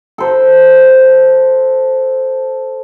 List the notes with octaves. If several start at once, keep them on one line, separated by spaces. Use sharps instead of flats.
A4 C5